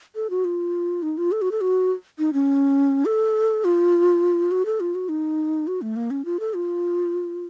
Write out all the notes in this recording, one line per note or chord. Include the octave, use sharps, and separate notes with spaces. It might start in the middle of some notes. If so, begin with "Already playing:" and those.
A4
F#4
F4
D#4
F4
A4
F#4
A4
F#4
D#4
C#4
A4
F4
F#4
A4
F4
F#4
D#4
F#4
A3
A#3
C#4
F4
A4
F4